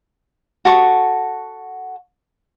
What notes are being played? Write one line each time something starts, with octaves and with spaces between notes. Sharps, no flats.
F#4 A4 C#6